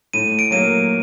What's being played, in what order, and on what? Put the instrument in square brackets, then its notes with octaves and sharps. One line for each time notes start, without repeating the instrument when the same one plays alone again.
[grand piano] A2 [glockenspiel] D#7
[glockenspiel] D7
[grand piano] F#3 A#3 [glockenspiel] D#7